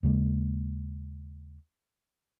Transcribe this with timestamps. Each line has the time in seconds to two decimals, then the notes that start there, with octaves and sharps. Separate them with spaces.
0.03 D#2 C#3 G#3 A#3